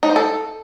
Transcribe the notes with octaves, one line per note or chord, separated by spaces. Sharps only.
D#4
C5
A4